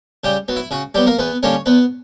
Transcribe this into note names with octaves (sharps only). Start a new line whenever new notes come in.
C#3 G3 G4
F#3 B3
E4
C#3 F#4
F#3 G3 B3 G4
A#3 A#4
E2 B3 B4
D3 G3 A#3 C#4 C#5
E2 B3 B4